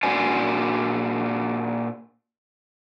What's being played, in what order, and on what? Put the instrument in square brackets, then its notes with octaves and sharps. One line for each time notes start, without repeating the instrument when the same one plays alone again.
[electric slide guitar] A#2 D4 F#4 C5 G#5